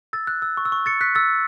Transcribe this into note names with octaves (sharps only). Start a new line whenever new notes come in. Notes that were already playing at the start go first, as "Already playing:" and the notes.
E6 A6
F#6
E6
C#6
E6
C#6
A6 C#7
F#6 B6
E6 A6